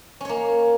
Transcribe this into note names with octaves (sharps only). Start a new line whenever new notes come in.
A#3 C#4 C#5